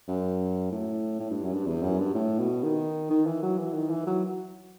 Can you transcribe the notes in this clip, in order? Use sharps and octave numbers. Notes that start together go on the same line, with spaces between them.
F#2
A2
A2
G2
F#2
G2
E2
F#2
G2
A2
B2
D#3
D#3
E3
F#3
E3
D#3
E3
F#3